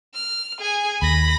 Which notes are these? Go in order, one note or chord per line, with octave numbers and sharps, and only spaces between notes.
F6
G#4 G#5
D#2 B5 A#6